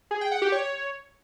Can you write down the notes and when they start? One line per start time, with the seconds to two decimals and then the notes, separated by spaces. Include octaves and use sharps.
0.11 G#4
0.21 G5
0.31 F#5
0.42 G4
0.52 C#5